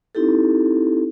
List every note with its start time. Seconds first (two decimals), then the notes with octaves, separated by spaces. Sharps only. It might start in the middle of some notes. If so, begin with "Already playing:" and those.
0.15 C4 D#4 E4 G4 A4